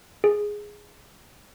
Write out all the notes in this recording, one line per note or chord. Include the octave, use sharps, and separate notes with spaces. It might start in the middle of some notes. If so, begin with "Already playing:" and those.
G#4